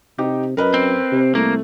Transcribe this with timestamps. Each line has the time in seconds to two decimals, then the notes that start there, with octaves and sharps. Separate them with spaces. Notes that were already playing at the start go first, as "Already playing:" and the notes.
0.18 C3 D#4 G4
0.57 F#2 A#4 B4 D#5
0.74 C4
1.12 C3
1.35 C2 A3 A#3